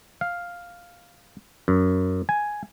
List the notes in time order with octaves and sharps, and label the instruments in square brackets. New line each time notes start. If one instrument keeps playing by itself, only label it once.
[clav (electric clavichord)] F5
F#2
G#5